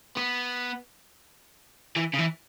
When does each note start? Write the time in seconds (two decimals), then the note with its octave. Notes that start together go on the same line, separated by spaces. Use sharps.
0.17 B3
1.96 E3
2.13 C#3
2.18 E3